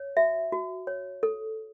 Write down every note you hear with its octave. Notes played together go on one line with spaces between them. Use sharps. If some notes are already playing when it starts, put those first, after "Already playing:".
Already playing: C#5
F#4 E5
F#4
C#5
A4